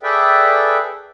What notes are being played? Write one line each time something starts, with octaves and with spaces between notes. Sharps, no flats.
G#4 A4 B4 D5 E5 G5